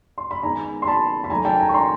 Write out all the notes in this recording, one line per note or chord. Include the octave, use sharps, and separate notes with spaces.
C6
B5
D#3 G#3 B3 G#5 A#5
C6
A5 B5
B5
D#3 F#3 A3 G#5 A#5
G5 A5
G#5 A#5
C#6
A#5 C6